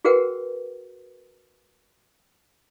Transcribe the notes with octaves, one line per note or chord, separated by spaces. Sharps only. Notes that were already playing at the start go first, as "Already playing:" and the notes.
F#4 G#4 A#4 B4 F#5 G5